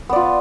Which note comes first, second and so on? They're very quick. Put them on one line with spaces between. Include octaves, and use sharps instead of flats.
B3 D5 F4